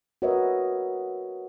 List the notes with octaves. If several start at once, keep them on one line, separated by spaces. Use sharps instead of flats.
F#4 A#4 B4 C#5 D#5 E5